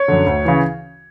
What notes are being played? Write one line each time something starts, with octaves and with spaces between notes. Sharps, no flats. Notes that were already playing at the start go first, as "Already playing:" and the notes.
Already playing: C#5
F#2 D3
D2
C#3 E3